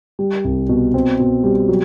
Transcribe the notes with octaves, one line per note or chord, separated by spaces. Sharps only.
G3
C2
B2
C4
B2
G3
F#3